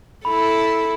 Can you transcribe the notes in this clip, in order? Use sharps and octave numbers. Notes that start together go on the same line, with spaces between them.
E4 A4 B5